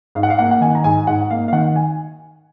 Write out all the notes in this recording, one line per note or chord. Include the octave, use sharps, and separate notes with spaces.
G#2 F5
F#5
F5
A#3 F#5
F#5
D#3 G#5
A#5
G#2 G#5
G#2 F#5
A#3 F5
F5
D#3 F#5
G#5